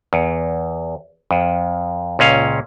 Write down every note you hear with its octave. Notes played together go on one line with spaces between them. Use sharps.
E2
F2
C#2 A#2 C#4 F5